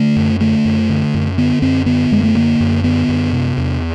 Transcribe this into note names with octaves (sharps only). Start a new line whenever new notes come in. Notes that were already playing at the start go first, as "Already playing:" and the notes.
Already playing: D3 A3
F#2
D3 A3
F#2
D3
F#2
D3 B3
F#2 C4
D3 B3
F#2 G#3
A3
D3 A#3
F#2
D3 B3
F#2
C3
E2